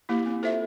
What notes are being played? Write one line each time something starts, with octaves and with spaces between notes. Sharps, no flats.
A#3 E4 G4
C4
F4 A4 C5 E5